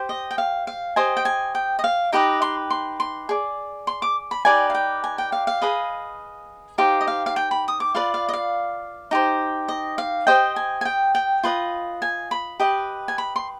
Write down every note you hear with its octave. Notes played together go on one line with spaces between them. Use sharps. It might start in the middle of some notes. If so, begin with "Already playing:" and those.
Already playing: G4 C5
D#5
G5
F5
F5
G4 C5 D#5 G#5
G5
G#5
G5
D#5
F5
D#4 G4 B4 D#5 G5
C6
C6
C6
G#4 D5
C6
D6
B5
D#4 G4 B4 D5 G#5
F5
G5
G#5
G5
F5
F5
G#4 B4 D#5
D#4 G4 C5 F5
D#5
F5
F5
G5
B5
D#6
D6
F4 B4 D5 F5
F5
D#5
F5
D#4 G4 C5
D#5
F5
G4 C5 D#5 G5
G#5
G#5
G5
G5
F4 B4 D#5
G#5
B5
G4 B4 D#5
G#5
B5
C6